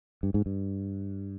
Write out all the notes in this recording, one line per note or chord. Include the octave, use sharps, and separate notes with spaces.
G2
G#2
G2